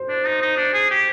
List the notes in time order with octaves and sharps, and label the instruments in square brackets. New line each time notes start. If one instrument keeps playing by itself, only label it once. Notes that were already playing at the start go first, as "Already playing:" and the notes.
Already playing: [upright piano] C5
[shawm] D4
D#4
D#4
D4
G#4
G4